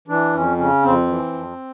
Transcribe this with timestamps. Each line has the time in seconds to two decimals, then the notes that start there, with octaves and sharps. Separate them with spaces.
0.08 E3 D4
0.33 F2 C#4
0.57 C#3 C#4
0.83 F2 C4
1.07 E3
1.33 F2